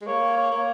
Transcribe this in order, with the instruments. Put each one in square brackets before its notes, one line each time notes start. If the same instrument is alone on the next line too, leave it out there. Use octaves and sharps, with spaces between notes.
[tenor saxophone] G#3
[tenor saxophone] A#3 [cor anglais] C#5
[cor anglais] C#5
[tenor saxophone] A#3